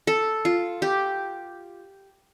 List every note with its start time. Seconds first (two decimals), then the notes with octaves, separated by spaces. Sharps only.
0.07 A4
0.45 F4
0.82 G4